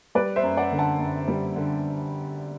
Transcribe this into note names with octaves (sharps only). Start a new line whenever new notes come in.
G3 B4 D5
C5 E5
F#2
D5 F#5
D3
F#5 A5
F#2
G3
D3